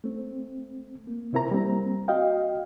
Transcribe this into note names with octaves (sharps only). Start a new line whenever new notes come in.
A3 C4
A#3
C3 C4 E4 A#4 A#5
G3 A#3 C4
F#4 D#5 F5 G5